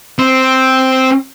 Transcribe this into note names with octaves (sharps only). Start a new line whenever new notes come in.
C4